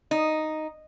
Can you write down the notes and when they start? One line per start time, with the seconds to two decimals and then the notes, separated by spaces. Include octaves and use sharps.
0.11 D#4